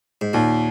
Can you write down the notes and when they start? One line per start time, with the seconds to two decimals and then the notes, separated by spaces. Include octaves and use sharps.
0.21 G#2
0.33 D#2 A#2